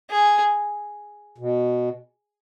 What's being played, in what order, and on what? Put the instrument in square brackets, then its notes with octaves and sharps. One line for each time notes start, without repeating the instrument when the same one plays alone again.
[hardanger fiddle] G#4
[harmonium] B2